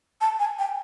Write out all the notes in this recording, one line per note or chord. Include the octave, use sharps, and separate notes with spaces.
A5
G#5
G5